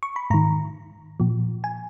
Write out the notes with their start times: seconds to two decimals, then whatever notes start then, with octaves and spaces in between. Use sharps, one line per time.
0.03 C#6
0.16 B5
0.30 G#2 D#3 A#5
1.20 A#2 F3
1.64 G#5